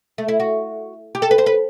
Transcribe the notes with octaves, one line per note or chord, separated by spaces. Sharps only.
A3
E4
F#4
G4
A4
B4
C5
B4